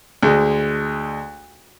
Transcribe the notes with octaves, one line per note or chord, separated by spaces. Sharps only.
D2 G#3